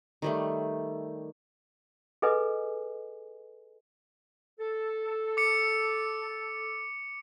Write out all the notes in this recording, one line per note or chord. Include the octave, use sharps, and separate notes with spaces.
D#3 G3 A3
G#4 A4 B4 D#5 G#5
A4
D6 C#7